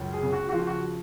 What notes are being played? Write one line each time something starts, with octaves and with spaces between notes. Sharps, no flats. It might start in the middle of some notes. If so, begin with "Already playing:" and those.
Already playing: C#2 F#2
G#4
C#3
F#4
F#4
F3 F4
F#4